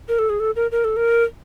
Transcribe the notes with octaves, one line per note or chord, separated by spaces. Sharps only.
A#4
A4
G#4
A4
A#4
A#4
A4
A#4